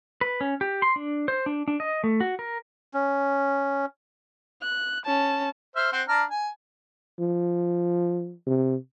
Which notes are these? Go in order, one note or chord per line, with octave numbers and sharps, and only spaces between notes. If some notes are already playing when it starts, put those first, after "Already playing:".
B4
C#4
G4
C6
D4
C5
D4
D4
D#5
A3
F#4
A#4
C#4
F#6
C#4 A5
C5 E5 F6
C4 C5 F#5
D4 A#5 F6
G#5
F3
C3